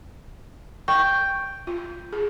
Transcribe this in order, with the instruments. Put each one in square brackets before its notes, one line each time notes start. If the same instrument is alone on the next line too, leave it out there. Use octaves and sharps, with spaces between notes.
[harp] G5 [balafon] C#6
[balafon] F4
G#4